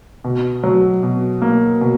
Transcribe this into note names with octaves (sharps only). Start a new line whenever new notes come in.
B2
F#3
B2
A#3
B2